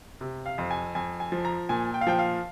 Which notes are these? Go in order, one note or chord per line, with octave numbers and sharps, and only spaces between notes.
C3
F5
F2
G#5
F2 G#5
G#5
F3
A#5
A#2 G#5
G5
F5
F3 G5
F5